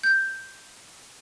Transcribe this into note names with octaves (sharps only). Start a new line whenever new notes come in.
G6